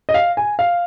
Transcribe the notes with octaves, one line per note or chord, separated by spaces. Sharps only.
D#5
F5
G#5
F5